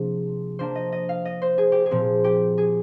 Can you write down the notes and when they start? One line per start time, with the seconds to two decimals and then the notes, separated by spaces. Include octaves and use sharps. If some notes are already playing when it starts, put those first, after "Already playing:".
Already playing: C3 F3 A#3 D4 G#4
0.59 F3 A#3 D4 C5
0.75 D#5
0.92 D#5
1.09 F5
1.25 D#5
1.42 C5
1.58 G#4
1.72 G4
1.86 G#4
1.91 A#2 F3 C4
2.24 G4
2.58 G#4